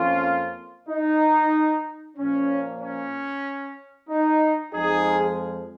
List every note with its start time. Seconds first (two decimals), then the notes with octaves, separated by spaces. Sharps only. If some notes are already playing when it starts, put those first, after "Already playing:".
Already playing: F2 F3 A#3 C#4 F4
0.89 D#4
2.17 A#2 F3 A#3 C#4
2.81 C#4
4.10 D#4
4.73 F2 F3 G#3 D#4 G#4